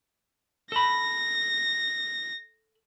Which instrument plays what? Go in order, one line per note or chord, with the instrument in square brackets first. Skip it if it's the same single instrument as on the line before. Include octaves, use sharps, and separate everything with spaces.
[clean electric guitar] A4 B5 [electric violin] A#6